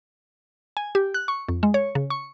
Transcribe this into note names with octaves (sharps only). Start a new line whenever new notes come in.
G#5
G4
F#6
C#6
F2
G#3
C#5
C#3
C#6